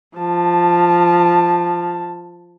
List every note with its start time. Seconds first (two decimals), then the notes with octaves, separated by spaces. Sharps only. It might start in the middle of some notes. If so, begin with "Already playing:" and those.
0.18 F3 A5